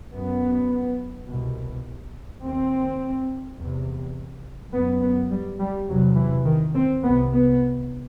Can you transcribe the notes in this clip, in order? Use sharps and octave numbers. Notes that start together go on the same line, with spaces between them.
F#2 B3
C2 B2
D#2 C4
E2 C3
F#2 B3
B3
G3
G3
E2 C3 F#3
E3
D#3
C4
C2 C3 B3
B3